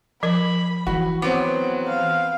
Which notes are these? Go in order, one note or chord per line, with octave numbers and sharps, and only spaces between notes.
F3 A#4 B5
E3 F#4
F#3 B3 C4 D6
F5